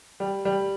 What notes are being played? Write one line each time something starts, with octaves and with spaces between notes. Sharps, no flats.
G3
G3